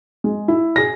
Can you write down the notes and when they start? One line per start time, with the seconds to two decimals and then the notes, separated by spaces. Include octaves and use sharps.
0.24 G#3
0.48 E4
0.76 G#4 A#6